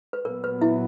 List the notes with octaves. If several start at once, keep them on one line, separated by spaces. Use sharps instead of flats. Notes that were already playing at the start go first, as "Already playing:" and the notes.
B4
A#2 F#3 B3 A#4
B4
E4 E5